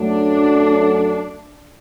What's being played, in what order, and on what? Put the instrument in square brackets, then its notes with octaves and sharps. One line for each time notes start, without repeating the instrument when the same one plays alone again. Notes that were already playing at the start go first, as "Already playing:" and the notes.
Already playing: [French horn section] F#2 F#3 A3 [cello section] D4